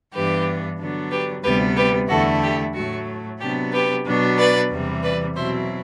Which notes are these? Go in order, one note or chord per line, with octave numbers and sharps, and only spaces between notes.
G2 E3 B3 D4 G4 B4
D3 F#3 B3 D4
G4 B4
D2 C3 G3 B3 G4 B4
G4 B4
E2 D3 A3 E4 F#4 A4
G4
A2 F#3 A3 F#4
C3 F#3 B3 D4 G4
G4 B4
B2 F#3 B3 D4
B4 D5
E2 C3 E3 G3
B4 D5
B2 F#3 C4 E4 C5 E5